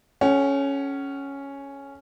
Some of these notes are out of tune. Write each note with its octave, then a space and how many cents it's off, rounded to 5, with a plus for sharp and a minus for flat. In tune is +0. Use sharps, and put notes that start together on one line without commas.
C#4 +0 A4 -35 F#5 +40